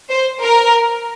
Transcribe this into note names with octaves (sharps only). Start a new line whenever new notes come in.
C5
A#4